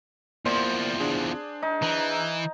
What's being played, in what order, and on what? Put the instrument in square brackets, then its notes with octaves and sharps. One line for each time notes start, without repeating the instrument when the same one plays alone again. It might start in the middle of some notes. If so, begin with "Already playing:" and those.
[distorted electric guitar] E2 F3 [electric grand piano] A#3 D5 [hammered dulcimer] C5
[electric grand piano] D4 G#4
[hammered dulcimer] D#4
[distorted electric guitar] E3 [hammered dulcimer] A#5